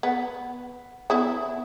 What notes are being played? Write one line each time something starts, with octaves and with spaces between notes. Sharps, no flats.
B3
B3 E4